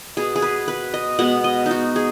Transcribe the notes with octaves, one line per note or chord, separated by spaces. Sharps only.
B2 B3 G#4
G#4
B4
B4
D#5
B2 G#3 B3 F#5
D#5
D#4 F#4
G#4